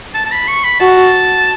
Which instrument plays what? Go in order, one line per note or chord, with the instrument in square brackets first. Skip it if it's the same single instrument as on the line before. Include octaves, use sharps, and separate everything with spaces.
[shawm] A5
A5
B5
C#6
B5
[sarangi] F#4 [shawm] A5